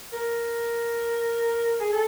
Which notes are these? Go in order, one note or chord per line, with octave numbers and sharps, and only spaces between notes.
A#4
G#4
A4